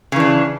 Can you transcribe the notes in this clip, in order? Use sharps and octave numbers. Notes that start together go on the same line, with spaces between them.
C#3 E3 D4